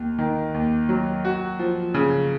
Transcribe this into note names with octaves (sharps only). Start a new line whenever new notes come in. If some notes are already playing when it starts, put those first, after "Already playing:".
Already playing: D#2
D#3
D#2
F#3
F#4
F3
C#3